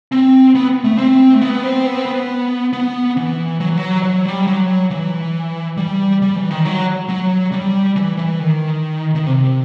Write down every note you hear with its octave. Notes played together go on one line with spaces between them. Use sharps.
C4
B3
A3
C4
A3
B3
C4
B3
C4
B3
B3
E3
F#3
E3
F#3
F#3
G3
F#3
E3
G3
G3
E3
D#3
F#3
F#3
G3
E3
E3
D#3
D#3
C3